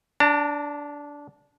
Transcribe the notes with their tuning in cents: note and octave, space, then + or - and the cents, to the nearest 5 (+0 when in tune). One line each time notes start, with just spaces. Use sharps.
D4 -15 A5 +40